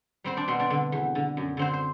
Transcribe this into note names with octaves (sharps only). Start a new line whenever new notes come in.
G3 C4 C5
D4 D5
B2 C4 C5
D4 D5
D3
E2
D3
F#2
D3 C4 C5
C5